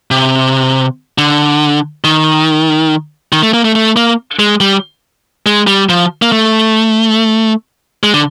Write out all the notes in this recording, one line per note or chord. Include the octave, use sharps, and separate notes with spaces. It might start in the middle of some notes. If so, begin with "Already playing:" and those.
C3
D3
D#3
D#3
A3
A#3
A3
A3
A#3
G#3
G3
G#3
G3
F3
A#3
A3
G#3
D3